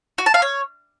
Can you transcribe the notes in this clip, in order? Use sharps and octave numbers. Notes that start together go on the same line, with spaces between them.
F#4
A5
F5
C#5